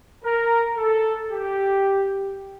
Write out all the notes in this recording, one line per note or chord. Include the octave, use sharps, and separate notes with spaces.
A#4
A4
G4